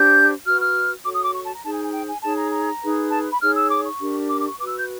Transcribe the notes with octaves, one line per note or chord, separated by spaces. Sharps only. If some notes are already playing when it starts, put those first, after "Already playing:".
Already playing: D4 G4 C5 G6
F#4 B4 F6
F6
F#4 A4 C#5 D6
D#6
D6
C#6
A5
A#5
D#4 G#4 C5 A5
G#5
G#5
G5
G#5
D#4 G#4 C#5 A5
A#5
A#5
D#4 G#4 B4
A5
B5
D#4 G#4 C#5 F6
E6
D6
C#6
D4 G4 A#4
D6
D6
C#6
F#4 B4 D6
E6
G6